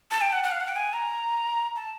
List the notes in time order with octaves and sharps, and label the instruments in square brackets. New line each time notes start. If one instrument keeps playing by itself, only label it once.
[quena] A5
G5
F#5
F#5
F5
F#5
G5
G#5
A#5
A5